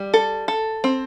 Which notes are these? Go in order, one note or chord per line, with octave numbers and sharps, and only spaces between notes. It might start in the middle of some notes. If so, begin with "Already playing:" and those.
Already playing: G3
A4
A4
C4